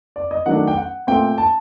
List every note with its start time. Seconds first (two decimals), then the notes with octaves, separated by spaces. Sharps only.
0.16 D5
0.31 D#5
0.46 D#3 F#3 A3 D4 F#5
0.67 G5
0.77 F#5
1.07 A#2 A3 C4 G5
1.38 A5